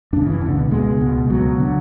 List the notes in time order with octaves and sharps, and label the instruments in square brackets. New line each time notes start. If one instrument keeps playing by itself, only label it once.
[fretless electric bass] F#2 C#3 D4
E3
C#2 B2 D3
B3
C#2 B2 G#3
C#2 B2
C#2 B2 F#3
D3